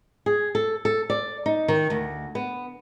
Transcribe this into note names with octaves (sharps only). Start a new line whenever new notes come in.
G#4
A4
A4
D5
D#4
D#3
D2
B3